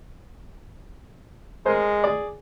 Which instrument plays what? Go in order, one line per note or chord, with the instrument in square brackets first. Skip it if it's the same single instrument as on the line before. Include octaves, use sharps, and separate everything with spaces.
[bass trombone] G#3 [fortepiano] A#4 C5
[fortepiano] G#4 D5